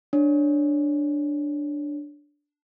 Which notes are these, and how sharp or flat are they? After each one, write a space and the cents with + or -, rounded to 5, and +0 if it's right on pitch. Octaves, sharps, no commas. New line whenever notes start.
D4 +0 C#5 +0